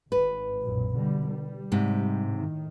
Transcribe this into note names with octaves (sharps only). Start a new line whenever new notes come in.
G#1 B4
B1 F#2 A#2
B2 D3 G3
G3
G#2 C3
A2 D#3